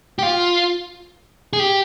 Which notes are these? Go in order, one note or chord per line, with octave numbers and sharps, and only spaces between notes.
G4
F4
G#4
G4